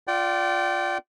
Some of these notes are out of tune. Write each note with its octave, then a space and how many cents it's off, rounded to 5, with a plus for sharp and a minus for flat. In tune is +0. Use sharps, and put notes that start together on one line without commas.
F4 +0 D5 +0 G5 -35